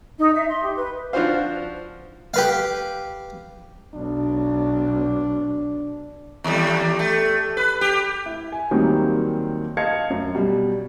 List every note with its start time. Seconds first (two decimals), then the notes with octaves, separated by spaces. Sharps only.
0.17 D#4
0.33 E5
0.47 C6
0.62 G4
0.75 B4
1.13 F3 D4 F4 F#4 C5 F5
2.34 G4 B4 F5
3.94 B1 D4
6.44 D#2 G3
6.99 A3
7.57 B4
7.81 G4
8.26 E4
8.52 G#5
8.71 D#2 D#3 F#3 G3 A#3 C4
9.77 D#5 F5 A5 G#6 C#7
10.10 F#2
10.35 B2 G3